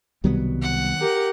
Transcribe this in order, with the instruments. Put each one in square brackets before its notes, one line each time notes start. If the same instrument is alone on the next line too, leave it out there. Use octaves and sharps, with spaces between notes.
[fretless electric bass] C2 B2 G3 [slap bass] D#3 F#3 B3
[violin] F#5
[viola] G4 A#4